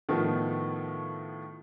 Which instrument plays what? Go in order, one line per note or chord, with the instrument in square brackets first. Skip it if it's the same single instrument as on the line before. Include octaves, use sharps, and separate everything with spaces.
[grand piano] A2 D#3 F3 A3 B3